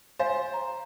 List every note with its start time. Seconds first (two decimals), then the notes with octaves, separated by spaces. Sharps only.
0.19 C5 D#5 F5 G#5
0.54 A#5